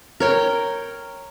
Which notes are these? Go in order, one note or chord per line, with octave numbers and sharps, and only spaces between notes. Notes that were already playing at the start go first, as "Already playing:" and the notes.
A#4 C#5 G5